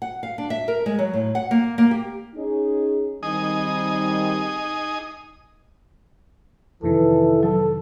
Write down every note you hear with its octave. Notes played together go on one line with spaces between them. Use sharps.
F#5
F5
D4
E5
A#4
G#3
F#3
A2
F#5
A#3
A#3
G4
C#4 D#4 G#4
D#3 G3 C4 D#4 G#5 D#6
F2 C3 D#3 E3 A4
F#3 A4